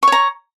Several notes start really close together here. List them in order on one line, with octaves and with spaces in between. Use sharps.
C#6 C#5 A#5